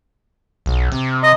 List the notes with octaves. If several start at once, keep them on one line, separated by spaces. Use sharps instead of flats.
B1
C3
D#5